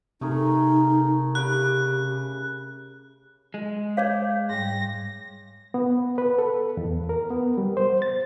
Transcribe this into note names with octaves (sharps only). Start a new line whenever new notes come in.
C3 A3 D#4 G#4 A#4
C#3 G4 B5 F#6
G#3
C#5 F5 D6 G6 G#6
G#2 G3 A#6
B3
B4
A4
E2
A#4
B3
G3
C5
A6